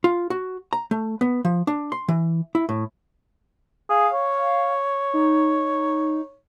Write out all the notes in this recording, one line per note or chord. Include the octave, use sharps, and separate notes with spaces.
F4
F#4
A#5
A3
B3
F3
D4
C6
E3
E4
A2
G#4 F5
C#5
D#4